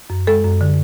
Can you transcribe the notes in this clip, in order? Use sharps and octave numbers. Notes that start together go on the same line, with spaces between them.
F#2
G#3 A4
F#2
D3